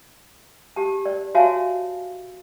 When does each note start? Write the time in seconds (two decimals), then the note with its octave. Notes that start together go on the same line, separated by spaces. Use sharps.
0.76 G4 A5
1.06 D5
1.35 F#4 C#5 E5 F5 G#5 A5